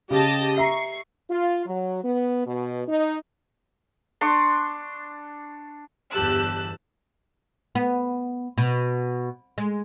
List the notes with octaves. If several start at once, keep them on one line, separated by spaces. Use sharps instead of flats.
C#3 G4 D#5 A5
E5 A#5 C#6 C7
F4
F#3
B3
B2
D#4
D4 C6 C#6
G1 E2 G4 A5 E6 F#6
B3
B2
G#3